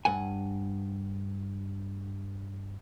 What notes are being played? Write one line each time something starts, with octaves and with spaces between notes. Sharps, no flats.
G2 F#5 G#5